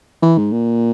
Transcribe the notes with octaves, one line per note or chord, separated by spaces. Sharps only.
E3
G#2
A#2